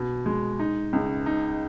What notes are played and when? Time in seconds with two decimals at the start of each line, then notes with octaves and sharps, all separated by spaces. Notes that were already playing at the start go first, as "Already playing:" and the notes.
Already playing: B2
0.26 G#3
0.59 D#4
0.93 C#2
1.26 D#4